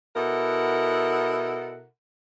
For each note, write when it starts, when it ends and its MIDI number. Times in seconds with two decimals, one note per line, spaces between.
0.16 1.84 47
0.16 1.84 64
0.16 1.84 69
0.16 1.84 70
0.16 1.84 78